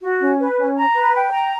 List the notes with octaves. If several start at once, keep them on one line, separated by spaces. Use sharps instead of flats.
F#4
C#4
B4
C#4
A#5
B4
G5
A#5